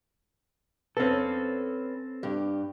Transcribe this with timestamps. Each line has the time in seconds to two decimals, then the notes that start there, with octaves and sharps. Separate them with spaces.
0.97 C4 C#4 A4 B4
2.23 G2 G4